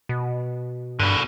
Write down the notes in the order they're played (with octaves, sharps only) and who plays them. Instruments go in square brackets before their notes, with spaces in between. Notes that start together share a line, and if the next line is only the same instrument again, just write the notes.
[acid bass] B2
[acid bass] G2 [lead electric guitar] B2 D3